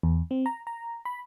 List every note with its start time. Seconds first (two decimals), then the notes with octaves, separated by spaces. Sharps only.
0.03 E2
0.31 C4
0.46 A#5
0.67 A#5
1.05 B5